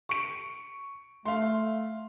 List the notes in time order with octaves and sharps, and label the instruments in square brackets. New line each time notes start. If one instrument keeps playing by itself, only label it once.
[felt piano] C#6 D7
[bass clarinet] A3 [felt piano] F5 C6